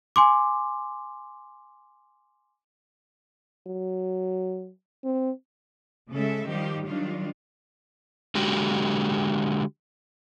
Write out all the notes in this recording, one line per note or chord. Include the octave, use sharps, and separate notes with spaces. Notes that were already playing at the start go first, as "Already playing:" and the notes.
G#5 C6 D6
F#3
C4
C#3 G#3 A4 E5
D#3 F3 G3 D#4 G4
D#3 F#3 G3 D4 F4
D3 G#3 F#4 G4